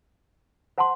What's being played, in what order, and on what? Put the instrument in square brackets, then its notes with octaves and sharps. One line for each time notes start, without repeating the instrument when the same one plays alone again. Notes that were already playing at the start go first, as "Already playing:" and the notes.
[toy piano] C5 F#5 A5 C6